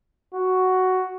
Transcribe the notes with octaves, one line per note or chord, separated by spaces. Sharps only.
F#4